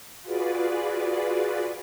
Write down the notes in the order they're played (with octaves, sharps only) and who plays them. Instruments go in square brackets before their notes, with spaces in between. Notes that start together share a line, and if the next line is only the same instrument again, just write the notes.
[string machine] F4 F#4 G#4 B4 D5